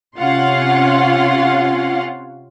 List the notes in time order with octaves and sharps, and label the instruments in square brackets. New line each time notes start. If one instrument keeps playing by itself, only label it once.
[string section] C3 C#4 F4 F5 F#5 C6